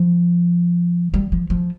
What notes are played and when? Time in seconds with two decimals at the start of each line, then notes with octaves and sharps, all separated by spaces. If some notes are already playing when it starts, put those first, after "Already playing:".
Already playing: F3
1.14 G3
1.32 F3
1.50 F3